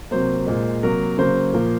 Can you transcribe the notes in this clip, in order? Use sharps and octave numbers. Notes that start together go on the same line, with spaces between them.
C3 F#3 A#3 C5
A#2 G#3
C3 F#3 A#3 A#4
C#3 F#3 A#3 C5
A#2 F3 A#3